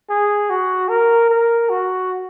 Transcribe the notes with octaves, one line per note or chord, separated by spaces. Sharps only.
G#4
F#4
A#4
A#4
F#4